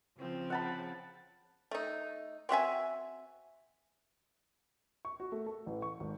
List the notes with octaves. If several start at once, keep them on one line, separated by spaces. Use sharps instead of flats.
C#3 F3 C4
F#5 A5 B5
A3 D#4
C4 F#4 E5 G#5
C#6
F#4
A3
A4
A1
C#6
G#1